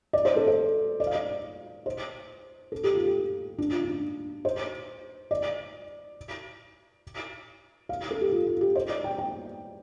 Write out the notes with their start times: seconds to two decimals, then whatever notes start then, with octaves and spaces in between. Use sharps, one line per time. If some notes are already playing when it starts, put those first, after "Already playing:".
0.13 D5
0.25 C5
0.36 A4
0.48 C5
1.00 D5
1.07 F5
1.15 D5
1.86 C5
2.72 A4
2.84 G4
2.95 F4
3.06 G4
3.58 D4
3.71 F4
3.84 D4
4.45 C5
5.31 D5
7.89 F5
8.11 A4
8.21 G4
8.32 F4
8.47 F4
8.61 G4
8.75 C5
8.89 D5
9.04 G5
9.18 G5